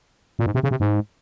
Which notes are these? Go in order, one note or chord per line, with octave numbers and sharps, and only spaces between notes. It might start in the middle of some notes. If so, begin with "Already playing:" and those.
A#2
G#2
C3
C#3
C3
G#2